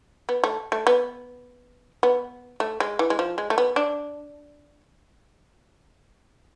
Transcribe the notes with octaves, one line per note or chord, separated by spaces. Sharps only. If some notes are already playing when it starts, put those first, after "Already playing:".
B3
A3
A3
B3
B3
A3
G#3
E3
G#3
F3
G#3
A3
B3
D4